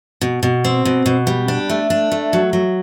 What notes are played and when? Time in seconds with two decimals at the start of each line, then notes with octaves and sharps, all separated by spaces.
0.21 B2
0.43 B2
0.64 C4
0.85 B2
1.06 B2
1.27 G3
1.48 D4
1.70 A3
1.90 D4
2.12 A3
2.33 F#3
2.53 F#3